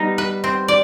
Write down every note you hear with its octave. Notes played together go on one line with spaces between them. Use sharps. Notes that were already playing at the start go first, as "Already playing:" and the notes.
Already playing: G3 B3 D#4
B4
C4
D5